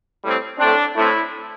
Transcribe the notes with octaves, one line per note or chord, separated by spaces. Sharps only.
A2 G3 C4
A2 A3 C4 D4
A2 A3 C4 E4